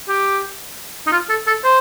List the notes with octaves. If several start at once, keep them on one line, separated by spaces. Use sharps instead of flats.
G4
D#4
F4
A4
A4
C5